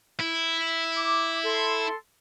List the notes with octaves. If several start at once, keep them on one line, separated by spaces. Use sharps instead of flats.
E4
D6
A4 C6